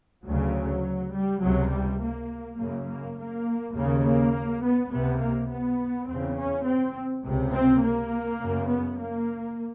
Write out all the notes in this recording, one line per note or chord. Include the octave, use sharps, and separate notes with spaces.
D2 C#3 F#3
G3
C#2 C3 F#3
G3
A#3
F#2 C#3 A#3
A#3
A#3
D#2 C#3 A#3
A#3
B3
C#2 C3 B3
A#3
B3
E2 C#3 C4
C#4
C4
C#2 C3
C4
A#3
F#2 C#3
B3
A#3